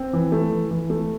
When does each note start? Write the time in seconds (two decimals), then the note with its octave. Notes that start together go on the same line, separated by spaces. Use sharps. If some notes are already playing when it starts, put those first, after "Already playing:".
Already playing: C4
0.13 E3
0.32 A3
0.52 E3
0.71 E3
0.90 A3